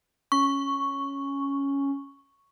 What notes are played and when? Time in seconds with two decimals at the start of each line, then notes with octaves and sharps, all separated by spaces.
0.32 C#4 C#6